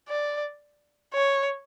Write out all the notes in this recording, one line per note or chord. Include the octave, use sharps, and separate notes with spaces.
D5
C#5